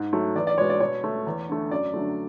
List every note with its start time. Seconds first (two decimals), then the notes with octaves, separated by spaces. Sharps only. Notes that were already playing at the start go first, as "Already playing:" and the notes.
Already playing: G#2
0.13 F#3 A3
0.35 E2 D5
0.47 D5
0.58 B2 G#3 C#5
0.70 D5
0.80 B2 C#5
1.04 A3
1.26 E2
1.48 D3 A3
1.71 F#2 D5
1.94 D3 F#3 A3